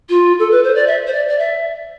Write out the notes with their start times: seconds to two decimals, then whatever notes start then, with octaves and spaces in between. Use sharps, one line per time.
0.09 F4
0.39 A4
0.51 B4
0.64 C5
0.75 D5
0.87 E5
1.07 C5
1.13 D5
1.28 D5
1.39 E5